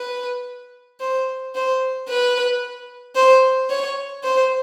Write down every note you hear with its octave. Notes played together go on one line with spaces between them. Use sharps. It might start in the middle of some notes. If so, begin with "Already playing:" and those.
Already playing: B4
C5
C5
B4
C5
C#5
C5